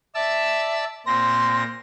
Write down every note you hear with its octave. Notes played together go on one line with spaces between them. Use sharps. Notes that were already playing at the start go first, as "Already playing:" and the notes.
D5 E5 A5 E6
A#2 C4 C6 A#6